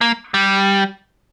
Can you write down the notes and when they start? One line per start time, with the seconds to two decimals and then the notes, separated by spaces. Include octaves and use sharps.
0.01 A#3
0.34 G3